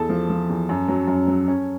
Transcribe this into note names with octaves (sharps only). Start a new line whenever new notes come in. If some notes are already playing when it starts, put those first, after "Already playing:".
Already playing: E2 A4 A5
F3
F3
E2
F#2
F#3
F#2
F#3
C#4